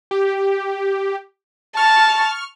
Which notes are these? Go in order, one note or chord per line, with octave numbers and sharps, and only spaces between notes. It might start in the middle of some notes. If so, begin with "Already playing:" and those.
G4
A5 C#6 F6